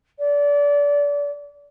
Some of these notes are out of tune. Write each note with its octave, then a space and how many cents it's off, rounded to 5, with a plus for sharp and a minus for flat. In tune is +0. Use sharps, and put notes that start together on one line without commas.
D5 -30